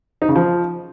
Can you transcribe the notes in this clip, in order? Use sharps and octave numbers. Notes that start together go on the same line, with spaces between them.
D#4
C#3
F3